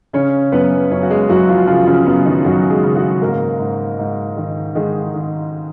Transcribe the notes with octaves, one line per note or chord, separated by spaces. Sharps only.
C#3 C#4 C#5
F#2 B3 B4
F#2 C#4 C#5
F#4
G#3 G#4
F#2 F#3 F#4
F3 F4
C#3 F3 F4
C#3 C#4
F#2 B3
D#3 D#4
F#2 F#3 F#4
G#3 G#4
C#3
F#3 F#4
G#2 A#3 A#4
G#2
G#2
D#3
D#3 G#3 G#4
D#3